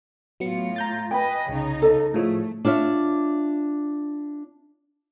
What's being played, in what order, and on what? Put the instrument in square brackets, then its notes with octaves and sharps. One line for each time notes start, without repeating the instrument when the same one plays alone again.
[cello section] A2 F4 [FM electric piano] F#3 B3 C#7
[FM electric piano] A#5 G6 A6
[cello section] B4 D#5 [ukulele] G5 B5 [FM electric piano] G#5
[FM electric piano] C2 [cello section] C#3 D#4
[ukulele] A4 D#5
[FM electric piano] A2 F3 [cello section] A3 [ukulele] E4 G#4 C#5
[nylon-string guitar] D4 F4 C#5 E5